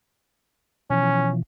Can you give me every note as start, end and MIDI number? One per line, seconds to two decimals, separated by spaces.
0.90 1.43 47
0.90 1.43 52
0.90 1.43 53
0.90 1.31 61